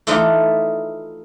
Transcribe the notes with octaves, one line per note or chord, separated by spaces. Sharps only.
E3 A3 D#4 F4 B4 D5